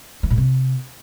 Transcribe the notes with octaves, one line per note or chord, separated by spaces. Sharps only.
E3
A2
C3